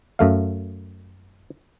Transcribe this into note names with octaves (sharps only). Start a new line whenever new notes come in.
F#2 A3 F5